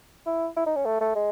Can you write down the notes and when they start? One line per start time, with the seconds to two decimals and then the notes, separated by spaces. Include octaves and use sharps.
0.26 E4
0.57 E4
0.66 D#4
0.76 C#4
0.86 A3
1.01 A3
1.15 G#3